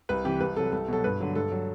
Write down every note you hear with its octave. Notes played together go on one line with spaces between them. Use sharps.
C2 B4
C3 E3 G4
C2 B4
C3 F#3 A4
C2 A4
B2 F#3 A4
G2 B4
D3 F#3
G2 A4
F#3